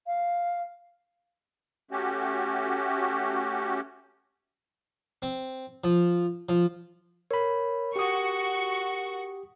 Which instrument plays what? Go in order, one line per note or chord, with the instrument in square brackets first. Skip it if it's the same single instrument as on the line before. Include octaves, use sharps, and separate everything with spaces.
[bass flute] F5
[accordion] A3 C#4 F#4 G4
[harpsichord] C4
F3
F3
[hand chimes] A#4 [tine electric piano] C#5 B5
[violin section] F#4 C#6 [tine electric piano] G4 D#6